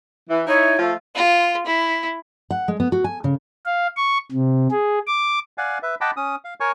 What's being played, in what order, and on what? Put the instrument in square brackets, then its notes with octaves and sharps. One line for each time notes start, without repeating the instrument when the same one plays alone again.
[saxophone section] E3
[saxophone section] D#4 E4 [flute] C#5
[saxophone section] F3 A3 F4
[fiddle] F4
E4
[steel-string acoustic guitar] F#5
G#3
B3
F#4
G#5
C#3
[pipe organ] F5
C#6
C3
G#4
D6
[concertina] D5 F5 F#5 G#5
B4 E5
D#5 F#5 G5 A5 B5 D6
C#4 D#6
F5
A#4 C#5 G#5 C#6